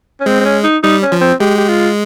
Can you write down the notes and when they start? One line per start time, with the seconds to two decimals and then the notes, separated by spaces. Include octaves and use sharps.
0.20 C#4
0.26 G#3 C4
0.40 C4
0.45 C#4
0.64 D#4
0.83 G3 D#4
1.02 C#4
1.12 F3
1.21 C4
1.40 G#3 G4
1.57 G4
1.69 F4